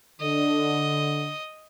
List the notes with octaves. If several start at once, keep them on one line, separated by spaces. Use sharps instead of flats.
D3 D#5